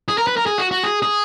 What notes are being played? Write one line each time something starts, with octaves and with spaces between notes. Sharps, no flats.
G#4
A#4
B4
A#4
G#4
F#4
F#4
G#4
G#4